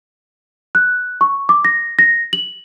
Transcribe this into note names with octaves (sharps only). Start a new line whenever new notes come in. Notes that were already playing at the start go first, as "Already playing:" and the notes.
F#6
C#6
D6
A#6
A#6
F#7